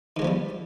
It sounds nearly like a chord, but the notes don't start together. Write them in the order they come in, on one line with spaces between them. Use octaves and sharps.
D#3 G#3 F3 B3 G3